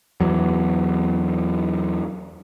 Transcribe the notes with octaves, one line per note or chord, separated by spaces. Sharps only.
E2 F#3